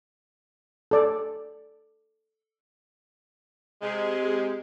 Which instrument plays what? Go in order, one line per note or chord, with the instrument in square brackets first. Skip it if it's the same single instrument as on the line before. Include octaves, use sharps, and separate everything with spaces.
[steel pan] A4 D5
[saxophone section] C3 G#3